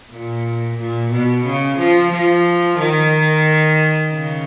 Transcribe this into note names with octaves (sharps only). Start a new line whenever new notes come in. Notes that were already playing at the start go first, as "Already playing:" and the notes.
A#2
A#2
B2
C#3
F3
F3
D#3
C#3